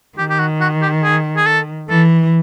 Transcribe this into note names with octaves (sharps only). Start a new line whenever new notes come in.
D#3 G4
G4
F#4
F#4
G4
G#4
G#4
A4
E3 A4